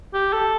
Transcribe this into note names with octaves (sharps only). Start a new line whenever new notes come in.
G4
A4